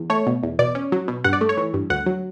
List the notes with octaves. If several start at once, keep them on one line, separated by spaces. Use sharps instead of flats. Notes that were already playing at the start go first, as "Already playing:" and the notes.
Already playing: E2
A3 C#5
B2
E2
B2 D5
C#4
F#3
B2
G2 F#5
D5
A3
C#5
E3
G2
D2 F#5
F#3